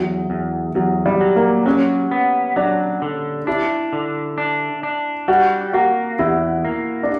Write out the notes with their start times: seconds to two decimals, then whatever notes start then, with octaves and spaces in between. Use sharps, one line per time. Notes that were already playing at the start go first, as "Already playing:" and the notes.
Already playing: E2 F#3
0.30 E2
0.75 E2 F#3
1.06 G3
1.21 F#3
1.36 A#3
1.66 F#3 C#4
2.11 B3
2.56 F#3 D4
3.02 D3
3.47 D4 E4
3.93 D3
4.38 D4
4.83 D4
5.28 G3 F#4
5.73 A#3 F#4
6.19 E2 E4
6.65 A#3
7.03 D4